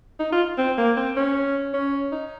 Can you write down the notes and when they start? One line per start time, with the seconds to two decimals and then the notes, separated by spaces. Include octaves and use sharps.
0.20 D#4
0.32 F4
0.58 C4
0.78 A#3
0.97 C4
1.17 C#4
1.74 C#4
2.12 D#4